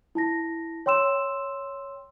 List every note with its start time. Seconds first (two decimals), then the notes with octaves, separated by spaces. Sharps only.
0.15 E4 A5 A#6
0.86 C#5 G5 C6 E6 E7